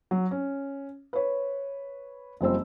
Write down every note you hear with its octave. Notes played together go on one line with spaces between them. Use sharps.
F#3
C#4
B4 C#5
F#1 F3 G3 C4 C5 E6